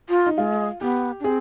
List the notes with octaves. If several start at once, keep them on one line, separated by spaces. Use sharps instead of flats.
F4
D#4
G#3 F4
B3 G4
D4
C4 G#4